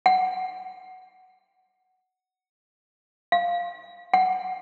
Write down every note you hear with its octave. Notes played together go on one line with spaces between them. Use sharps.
F#5
F5
F#5